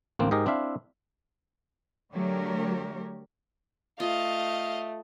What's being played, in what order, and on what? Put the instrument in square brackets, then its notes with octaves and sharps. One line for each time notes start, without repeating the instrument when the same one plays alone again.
[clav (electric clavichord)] A1 D2 A#3 C4
G#2 G4 G#4 A#4 D#5
C4 D4 E4 E5 F5
[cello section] D3 F#3 A3 G4 A#4 C#5
[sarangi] A3 [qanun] F4 [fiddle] D#5 [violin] F5